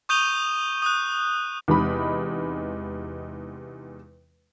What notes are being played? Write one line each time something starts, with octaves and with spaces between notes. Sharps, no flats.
C#6 D#6 G6 D#7 F7 G7
D#6 F#6
E2 C3 G#3 D#4 B5